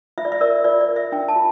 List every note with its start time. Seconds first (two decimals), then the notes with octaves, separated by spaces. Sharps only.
0.18 F4 E5
0.25 D5
0.32 E5
0.41 A#4 D5
0.64 F4 D5
0.81 D5
0.88 A#4
0.96 E5
1.12 D4 G5
1.28 A5
1.36 F4